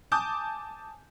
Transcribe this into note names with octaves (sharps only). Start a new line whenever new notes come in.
G#5 A5 D6 D#6 G6